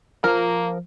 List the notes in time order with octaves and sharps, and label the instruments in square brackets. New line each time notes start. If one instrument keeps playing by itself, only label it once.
[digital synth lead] F3 [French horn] A#3 [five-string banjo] A#4